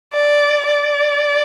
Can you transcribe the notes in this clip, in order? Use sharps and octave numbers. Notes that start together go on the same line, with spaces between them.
D5
D5